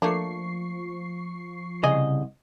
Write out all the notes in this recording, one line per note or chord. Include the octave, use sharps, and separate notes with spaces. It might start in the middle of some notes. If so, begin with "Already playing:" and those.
F3 A3 A#3 D4 C#6 C7
C2 C#3 G#4 D#5